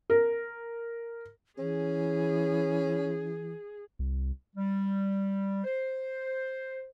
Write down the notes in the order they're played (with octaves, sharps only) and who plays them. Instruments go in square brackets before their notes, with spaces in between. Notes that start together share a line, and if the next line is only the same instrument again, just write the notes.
[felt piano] A#4
[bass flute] E3 [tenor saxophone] C#4 [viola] G#4
[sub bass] C2
[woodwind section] G3
C5